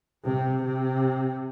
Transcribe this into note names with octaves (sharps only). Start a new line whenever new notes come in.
C3
C3